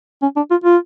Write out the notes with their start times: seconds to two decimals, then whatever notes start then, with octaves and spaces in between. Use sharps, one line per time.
0.22 C#4
0.36 D4
0.51 F4
0.64 F4